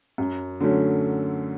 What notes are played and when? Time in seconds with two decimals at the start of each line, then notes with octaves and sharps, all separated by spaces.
0.18 F#2
0.60 D3 F#3 A3 C#4